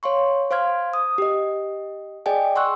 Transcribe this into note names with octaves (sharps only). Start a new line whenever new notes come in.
C#5 F5 C6 C#6
C5 F5 C6 F6 G#6
D#6
G4 D#5
G#4 D5 D#5 G5 G#5
F#5 C6 C#6 E6 F#6